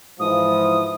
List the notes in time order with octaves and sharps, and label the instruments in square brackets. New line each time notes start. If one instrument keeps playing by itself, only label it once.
[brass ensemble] G#2 E3 F3 [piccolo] D#6